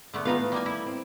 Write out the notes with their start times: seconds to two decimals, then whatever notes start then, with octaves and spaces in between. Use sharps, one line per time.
0.14 D3 A3 B3
0.25 D#3 B3 D#4 F4 B4 F5
0.38 A2
0.52 G3 A#3 G#5
0.66 E4
0.86 C4